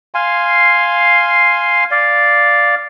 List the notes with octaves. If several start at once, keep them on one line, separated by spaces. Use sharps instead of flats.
F5 G#5 C6
D5 F5